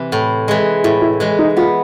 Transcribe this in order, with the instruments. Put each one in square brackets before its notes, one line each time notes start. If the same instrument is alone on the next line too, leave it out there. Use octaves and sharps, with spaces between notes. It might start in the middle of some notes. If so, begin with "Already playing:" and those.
Already playing: [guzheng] C3 E3
A2
E3 G#3
[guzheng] A2 [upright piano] E4
[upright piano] E4
[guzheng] E3 G#3
[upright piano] D#4
[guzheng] B3 [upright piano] F4